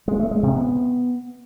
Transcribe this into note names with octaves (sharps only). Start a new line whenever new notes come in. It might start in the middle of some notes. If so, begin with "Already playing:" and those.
G#3
A3
G#3
C3
B3